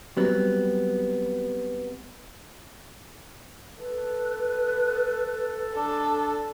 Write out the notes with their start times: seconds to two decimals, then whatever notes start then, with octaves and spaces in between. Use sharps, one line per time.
0.17 F#3 G3 B3 C4
3.79 A4 B4
5.76 D4 A4